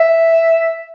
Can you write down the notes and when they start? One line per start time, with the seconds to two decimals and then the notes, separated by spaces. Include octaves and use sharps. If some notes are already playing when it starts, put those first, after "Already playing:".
Already playing: E5